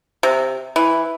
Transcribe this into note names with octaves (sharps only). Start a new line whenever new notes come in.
C3
E3